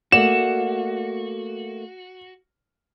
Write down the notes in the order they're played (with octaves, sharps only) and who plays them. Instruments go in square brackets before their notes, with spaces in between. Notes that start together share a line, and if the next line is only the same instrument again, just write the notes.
[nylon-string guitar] A3 A#3 D5 [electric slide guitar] F#4 [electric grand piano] E7